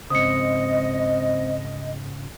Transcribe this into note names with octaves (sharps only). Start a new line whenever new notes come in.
G#2 C#3 C4 C5 D#5 D#6 C#7